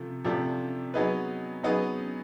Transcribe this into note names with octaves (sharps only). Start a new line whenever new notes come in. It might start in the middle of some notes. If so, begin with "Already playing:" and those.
Already playing: C3 F3 A3
C3 F3 A3 D4 G4
F#3 B3 D#4 G#4 B4
F#3 B3 D#4 G#4 B4